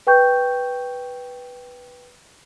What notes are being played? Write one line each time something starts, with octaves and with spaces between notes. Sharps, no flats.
B4 G5 C#6 G6